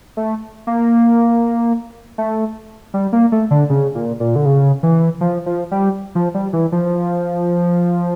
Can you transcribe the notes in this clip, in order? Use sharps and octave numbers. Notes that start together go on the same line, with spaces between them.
A3
A#3
A3
G3
A#3
A3
D3
C#3
A#2
A#2
D3
C#3
E3
F3
F3
G3
F3
G3
E3
F3